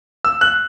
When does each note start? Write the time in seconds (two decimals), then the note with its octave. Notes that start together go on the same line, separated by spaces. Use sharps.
0.25 E6
0.41 F#6